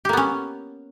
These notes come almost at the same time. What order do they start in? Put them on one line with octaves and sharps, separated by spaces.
G4 A#3 B3 C#4